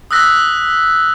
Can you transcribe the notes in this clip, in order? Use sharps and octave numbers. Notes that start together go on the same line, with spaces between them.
D#6 E6 F#6 A#6 B6